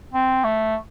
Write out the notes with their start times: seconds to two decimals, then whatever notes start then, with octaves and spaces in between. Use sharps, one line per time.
0.13 C4
0.44 A3